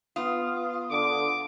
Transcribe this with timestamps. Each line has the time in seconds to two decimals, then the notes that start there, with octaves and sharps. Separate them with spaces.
0.16 B3 F4 D#6
0.91 D3 D6